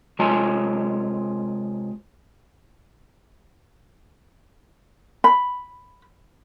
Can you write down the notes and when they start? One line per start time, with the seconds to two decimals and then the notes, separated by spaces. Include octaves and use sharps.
0.19 C3 G#3 F4 C#5 G#5 A5
5.24 B5